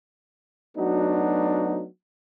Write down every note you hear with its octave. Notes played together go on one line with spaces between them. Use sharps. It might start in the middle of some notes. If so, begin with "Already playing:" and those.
F#3 A3 B3 D4 D#4 F#4